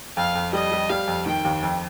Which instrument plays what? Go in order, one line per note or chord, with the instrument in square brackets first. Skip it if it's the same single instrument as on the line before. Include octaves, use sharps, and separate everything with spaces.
[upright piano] F2 [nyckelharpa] F5
[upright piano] F2
[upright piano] G3 [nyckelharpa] D#5
[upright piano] G3
[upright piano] G3 [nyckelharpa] F5
[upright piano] F2
[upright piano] D#3 [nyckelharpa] G5
[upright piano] D#2
F2